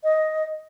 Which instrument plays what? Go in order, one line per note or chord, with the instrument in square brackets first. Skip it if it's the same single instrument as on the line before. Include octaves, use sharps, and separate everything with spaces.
[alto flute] D#5